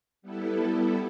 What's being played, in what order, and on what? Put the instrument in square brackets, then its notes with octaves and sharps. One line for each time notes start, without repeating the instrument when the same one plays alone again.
[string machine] G3 B3 E4 A4